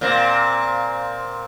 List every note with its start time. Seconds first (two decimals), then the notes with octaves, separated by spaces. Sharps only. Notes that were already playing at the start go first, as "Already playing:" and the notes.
0.01 A#2 C4